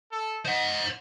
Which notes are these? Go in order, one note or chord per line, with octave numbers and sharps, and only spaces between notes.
A4
C5 D#5 F#5